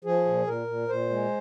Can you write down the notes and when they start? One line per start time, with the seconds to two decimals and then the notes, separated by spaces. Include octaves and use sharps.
0.04 F3 G#4
0.25 A#2
0.46 A#2 A#4
0.67 A#2
0.88 A#2 C5
1.10 G#3